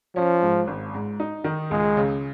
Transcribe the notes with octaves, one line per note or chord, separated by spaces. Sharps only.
F3 C#4
G#2
G#1
G#2
D#4
D#3
C#2 G#3
C#3